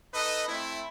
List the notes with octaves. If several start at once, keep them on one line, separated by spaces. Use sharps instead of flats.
D#4 A4 B4 D#5
A3 C4 E4